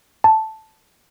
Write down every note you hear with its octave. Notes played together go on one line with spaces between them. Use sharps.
A5